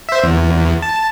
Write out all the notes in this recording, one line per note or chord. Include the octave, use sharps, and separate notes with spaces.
C5 E5
E2
A5